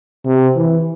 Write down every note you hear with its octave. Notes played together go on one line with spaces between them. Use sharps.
C3
E3